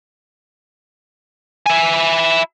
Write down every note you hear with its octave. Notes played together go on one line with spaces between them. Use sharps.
E4 G#5